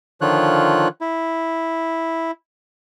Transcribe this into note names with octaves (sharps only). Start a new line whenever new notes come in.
D3 D#3 F3 F4 C#5 F#6
E4